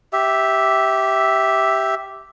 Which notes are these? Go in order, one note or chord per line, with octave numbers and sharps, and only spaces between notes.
G4 E5